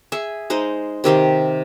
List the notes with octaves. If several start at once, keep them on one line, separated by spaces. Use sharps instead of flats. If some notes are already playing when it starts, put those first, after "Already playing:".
G#4 E5
G#3 D#4 C5
C3 D#3 G4 C5